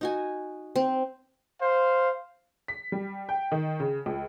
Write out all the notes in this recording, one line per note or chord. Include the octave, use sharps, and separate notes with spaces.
D#4 F#4 G#5
C4
C5 F5
B6
G3
G5
D#3
C#3
C#2